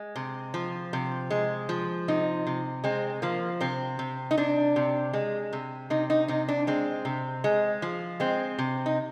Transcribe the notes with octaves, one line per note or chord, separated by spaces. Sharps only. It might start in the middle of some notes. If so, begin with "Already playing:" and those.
Already playing: G#3
C3
F3
C3
G#3
F3
C3 D#4
C3
G#3 C4
F3 A#3
C3 C4
C3
D#4
C3 D4
C3
G#3
C3
C3 D#4
D#4
C3 D#4
D4
G#3 C4
C3
G#3
F3
G#3 C4
C3
D#4